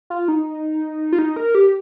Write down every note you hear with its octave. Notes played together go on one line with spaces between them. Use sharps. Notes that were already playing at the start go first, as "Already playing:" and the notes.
F4
D#4
F4
D#4
A#4
G4